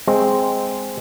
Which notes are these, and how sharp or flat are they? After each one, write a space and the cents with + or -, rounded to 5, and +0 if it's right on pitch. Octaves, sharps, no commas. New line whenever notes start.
G#3 +0 C4 +0